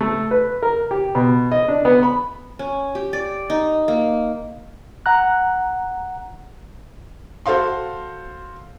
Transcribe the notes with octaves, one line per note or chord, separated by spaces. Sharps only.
A3
B4
A#4
G4
B2
D#5
D4
B3
B5
C#4
G4
D5
D#4
A#3
F#5 A#5 F#6
F#4 A4 C5 F5 C6